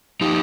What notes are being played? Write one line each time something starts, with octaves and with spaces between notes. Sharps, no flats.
F3 D#4 G4